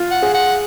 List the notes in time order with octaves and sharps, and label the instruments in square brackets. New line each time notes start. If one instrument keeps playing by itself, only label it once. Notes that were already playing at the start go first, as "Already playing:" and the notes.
Already playing: [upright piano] F4
[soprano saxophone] F#5
[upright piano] G#4
[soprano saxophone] F#5